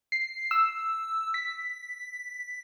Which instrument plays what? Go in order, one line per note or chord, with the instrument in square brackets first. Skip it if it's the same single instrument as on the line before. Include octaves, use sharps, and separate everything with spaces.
[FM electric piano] C7
E6
B6